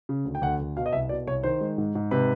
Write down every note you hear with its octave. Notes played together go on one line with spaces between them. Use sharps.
C#3
D2
G5
D2 F#5
D2
B2 F5
D#5
C2 E5
B2 D5
C2 C#5
D#3 C5
G#3
G#2
G#2
C3 B4